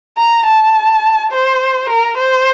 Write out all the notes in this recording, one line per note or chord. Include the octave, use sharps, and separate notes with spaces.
A#5
A5
C5
A#4
C5